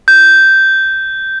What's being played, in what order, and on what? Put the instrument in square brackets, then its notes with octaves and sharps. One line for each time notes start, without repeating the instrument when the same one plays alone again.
[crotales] G6